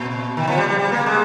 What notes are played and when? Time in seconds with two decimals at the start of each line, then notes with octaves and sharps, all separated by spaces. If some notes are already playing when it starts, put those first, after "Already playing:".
Already playing: A#2
0.37 D#3
0.48 F3
0.58 G3
0.68 G3
0.79 G3
0.92 A#3
1.06 G#3